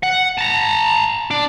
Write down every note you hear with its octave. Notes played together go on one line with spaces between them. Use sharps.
F#5
A5 A#5
D4